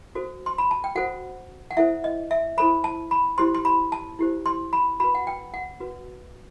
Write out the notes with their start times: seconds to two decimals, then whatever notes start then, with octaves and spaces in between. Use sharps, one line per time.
0.15 F#4 A4 C5
0.46 C6
0.58 B5
0.71 A5
0.84 G5
0.95 F#4 A4 C5 F#5
1.71 F#5
1.77 E4 A4 C5 E5
2.04 D#5
2.31 E5
2.57 E4 A4 C5 B5
2.84 A5
3.11 B5
3.38 E4 G4 C5 C6
3.55 C6
3.65 B5
3.92 A5
4.19 E4 G4 C5
4.46 C6
4.73 B5
5.00 F#4 B4 B5
5.15 F#5
5.27 G5
5.54 F#5
5.80 F#4 B4